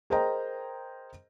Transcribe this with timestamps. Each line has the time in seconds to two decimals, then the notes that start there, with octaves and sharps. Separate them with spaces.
0.10 G#4 A#4 C5 D#5 G5 A#5